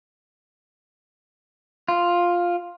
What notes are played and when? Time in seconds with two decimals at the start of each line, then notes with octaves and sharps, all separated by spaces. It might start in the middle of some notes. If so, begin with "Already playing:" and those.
1.88 F4